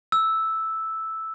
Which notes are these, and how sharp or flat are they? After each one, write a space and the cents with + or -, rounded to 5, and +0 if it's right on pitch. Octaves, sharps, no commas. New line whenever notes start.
E6 -5